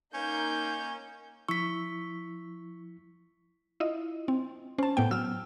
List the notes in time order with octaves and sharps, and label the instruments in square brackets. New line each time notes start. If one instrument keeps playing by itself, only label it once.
[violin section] A#3 D#4 G6 [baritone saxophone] C#4
[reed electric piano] F3 E4 E6 [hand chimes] C#6 B6
[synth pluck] E4 F4 D#5
[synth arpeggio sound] C4
[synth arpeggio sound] C#4 A5 [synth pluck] C5
[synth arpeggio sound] A2 B3 G5
[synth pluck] F#3 F6 [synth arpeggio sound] E6